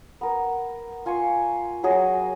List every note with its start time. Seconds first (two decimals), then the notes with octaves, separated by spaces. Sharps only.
0.21 B3 A#4
1.06 F4 G#5 C6 C#6
1.83 F#3 F#4 G#4 D#5